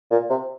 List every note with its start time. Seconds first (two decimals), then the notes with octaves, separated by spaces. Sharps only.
0.11 A#2
0.30 C3